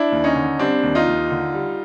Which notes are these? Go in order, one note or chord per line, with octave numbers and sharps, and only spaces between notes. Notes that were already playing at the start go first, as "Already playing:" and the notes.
Already playing: D4 E4
D#2
C#4 D#4
D3
G3 C4 D4
D#2
D#4 F4
D#2
D3
G3